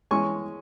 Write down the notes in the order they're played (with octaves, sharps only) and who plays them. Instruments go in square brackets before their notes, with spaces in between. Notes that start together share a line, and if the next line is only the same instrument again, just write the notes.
[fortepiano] E3 G#3 C#4 G#5 C#6